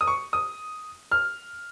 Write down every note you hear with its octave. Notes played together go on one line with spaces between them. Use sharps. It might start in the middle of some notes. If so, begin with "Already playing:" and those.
D#6
C#6
D#6
F6